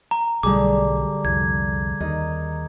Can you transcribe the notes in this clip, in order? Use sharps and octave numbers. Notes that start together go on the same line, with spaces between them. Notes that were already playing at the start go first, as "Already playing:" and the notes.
A#5
B1 A2 D3 G3 G#4 D6
C2 F2 G#6
D#2 D#3